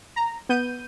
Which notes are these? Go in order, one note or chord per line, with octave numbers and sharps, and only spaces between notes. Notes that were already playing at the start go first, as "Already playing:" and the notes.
A#5
B3 G6 D#7